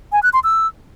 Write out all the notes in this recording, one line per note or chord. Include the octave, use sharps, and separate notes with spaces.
G#5
F#6
C6
E6